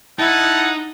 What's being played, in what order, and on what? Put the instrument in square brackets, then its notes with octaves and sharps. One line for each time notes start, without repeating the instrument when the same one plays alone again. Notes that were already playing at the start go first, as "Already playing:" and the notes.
[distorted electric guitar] D#4 [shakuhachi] E4 [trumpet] F#5 [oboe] A5